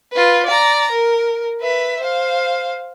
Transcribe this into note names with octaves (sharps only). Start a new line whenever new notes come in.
F4 B4
D5 A#5
A#4
B4 E5
C5 F5